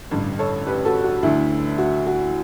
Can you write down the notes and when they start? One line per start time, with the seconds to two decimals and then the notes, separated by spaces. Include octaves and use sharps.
0.11 A1 G2 D3
0.39 A4 C#5
0.66 G4 B4
0.85 F#4 A4
1.04 F#4
1.23 D2 D3 E4
1.78 F#4
2.07 F#4